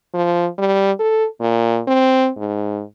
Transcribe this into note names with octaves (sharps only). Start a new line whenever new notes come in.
F3
G3
A4
A#2
C4
G#2